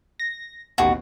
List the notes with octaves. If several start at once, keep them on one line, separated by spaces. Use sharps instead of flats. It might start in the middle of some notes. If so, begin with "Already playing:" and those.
A#6
A1 D#2 B2 F#4